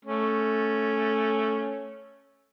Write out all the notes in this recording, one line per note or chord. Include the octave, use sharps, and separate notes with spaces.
A3 C#4